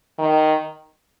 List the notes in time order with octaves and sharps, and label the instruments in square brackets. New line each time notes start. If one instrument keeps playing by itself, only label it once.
[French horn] D#3